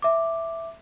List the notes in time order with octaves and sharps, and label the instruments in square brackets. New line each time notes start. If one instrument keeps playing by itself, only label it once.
[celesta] E5 D6